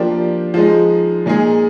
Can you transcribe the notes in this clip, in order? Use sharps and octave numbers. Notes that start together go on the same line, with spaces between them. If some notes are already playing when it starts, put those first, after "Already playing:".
Already playing: F3 A#3 D4 G4
F3 G#3 D#4
A#2 G#3 D#4 G#4